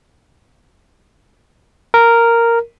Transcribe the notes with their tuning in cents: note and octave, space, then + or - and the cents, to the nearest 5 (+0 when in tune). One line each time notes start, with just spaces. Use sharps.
A#4 -5